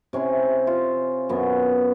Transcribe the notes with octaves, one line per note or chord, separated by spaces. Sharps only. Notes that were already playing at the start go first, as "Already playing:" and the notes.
C3 C#4 E4 C6
F4
F#2 B3